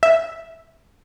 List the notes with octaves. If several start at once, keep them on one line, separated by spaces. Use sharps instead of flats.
E5